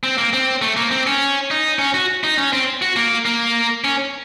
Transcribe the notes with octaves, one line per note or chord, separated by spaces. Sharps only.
C4
A#3
C4
A3
A#3
C4
C#4
D#4
C#4
F#4
D#4
C#4
C4
F#4
A#3
A#3
C#4